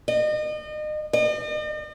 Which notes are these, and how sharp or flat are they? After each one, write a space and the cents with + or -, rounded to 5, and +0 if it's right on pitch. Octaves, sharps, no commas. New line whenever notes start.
D#5 -35
D#5 -45